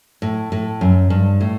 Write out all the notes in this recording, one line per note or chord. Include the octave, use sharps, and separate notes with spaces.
A2
A2
F#2
G2
A2